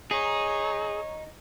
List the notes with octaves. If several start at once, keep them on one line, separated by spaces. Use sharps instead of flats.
D#4 G#4 C#5 A#5